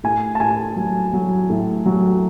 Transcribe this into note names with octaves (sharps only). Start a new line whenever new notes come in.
A2 G#5
A5
A2 G#5
F#3
F#3
A2
F#3